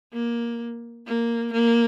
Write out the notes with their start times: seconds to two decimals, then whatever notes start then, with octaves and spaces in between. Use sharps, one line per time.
0.13 A#3
1.06 A#3
1.52 A#3